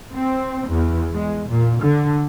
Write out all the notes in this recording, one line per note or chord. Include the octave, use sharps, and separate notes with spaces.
C4
E2
G#3
A#2
D3